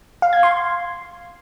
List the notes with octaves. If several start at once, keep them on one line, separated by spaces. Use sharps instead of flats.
F5
G#6
C6